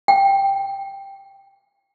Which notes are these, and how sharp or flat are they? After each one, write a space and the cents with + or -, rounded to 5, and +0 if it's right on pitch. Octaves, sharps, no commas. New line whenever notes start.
G5 +5